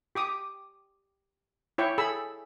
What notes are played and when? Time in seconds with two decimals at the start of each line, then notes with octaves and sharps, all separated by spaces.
0.15 G4 D6 D#6
1.78 E4 C#5 G5 C#6
1.98 G#4 A4 B5 E6